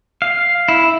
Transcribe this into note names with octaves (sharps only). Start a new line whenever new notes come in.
F5
E4